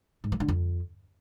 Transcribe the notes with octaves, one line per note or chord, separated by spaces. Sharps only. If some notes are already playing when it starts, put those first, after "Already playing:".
G#2
F3
D3
F2